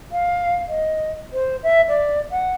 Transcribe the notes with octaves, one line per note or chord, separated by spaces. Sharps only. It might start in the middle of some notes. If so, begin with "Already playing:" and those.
F5
D#5
C5
E5
D5
F#5